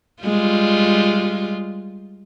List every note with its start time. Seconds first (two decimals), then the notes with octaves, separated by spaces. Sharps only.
0.23 G3 G#3 F4